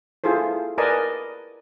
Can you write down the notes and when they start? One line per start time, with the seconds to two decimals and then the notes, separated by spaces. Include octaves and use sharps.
0.24 E4 F4 G#4 A4 C5
0.78 A#4 B4 D5 D#5 G#5 A5